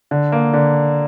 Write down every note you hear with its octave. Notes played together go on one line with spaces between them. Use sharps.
D3
A#3
D3